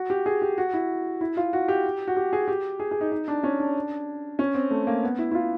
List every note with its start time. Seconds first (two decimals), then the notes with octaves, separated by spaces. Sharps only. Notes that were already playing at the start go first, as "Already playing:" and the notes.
Already playing: F#4
0.10 G4
0.26 G#4
0.42 G4
0.58 F#4
0.74 E4
1.21 E4
1.37 F4
1.53 F#4
1.68 G4
2.07 F#4
2.17 G4
2.33 G#4
2.48 G4
2.80 G#4
2.91 G#4
3.01 D#4
3.12 D#4
3.28 D4
3.43 C#4
3.60 D4
4.39 C#4
4.55 C4
4.71 A3
4.87 A#3
5.03 B3
5.18 E4
5.31 E4
5.35 F4